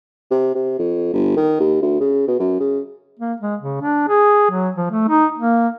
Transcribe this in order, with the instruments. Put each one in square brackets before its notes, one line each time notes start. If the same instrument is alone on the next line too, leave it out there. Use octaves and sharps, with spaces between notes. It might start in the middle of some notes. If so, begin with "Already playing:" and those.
[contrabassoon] C3
C3
F2
G1
D#3
D#2
D2
C#3
B2
F#2
C#3
[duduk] A#3
G#3
C#3
D4
G#4
F#3
F3
A3
D#4
A#3